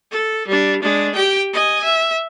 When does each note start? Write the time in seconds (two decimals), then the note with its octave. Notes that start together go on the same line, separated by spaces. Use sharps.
0.11 A4
0.48 G3 D4
0.82 G#3 D4
1.15 G4 G5
1.53 D#5 G#5
1.84 E5